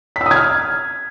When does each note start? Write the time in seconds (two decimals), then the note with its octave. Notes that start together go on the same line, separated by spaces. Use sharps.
0.16 B6
0.21 E6
0.26 D#6
0.31 G#6
0.36 F6